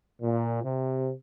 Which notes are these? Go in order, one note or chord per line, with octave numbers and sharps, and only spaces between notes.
A#2
C3